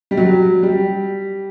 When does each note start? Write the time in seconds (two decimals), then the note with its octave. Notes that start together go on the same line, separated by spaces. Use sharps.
0.11 G3
0.17 F#3
0.63 G3